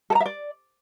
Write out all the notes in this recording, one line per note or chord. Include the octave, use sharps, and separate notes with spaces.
A4
A#5
E5
D5